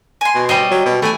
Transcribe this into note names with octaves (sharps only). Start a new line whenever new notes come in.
G#5 C6
B2
G3 C5 C#5 D#5
F#3
B2
E3 A3 G#5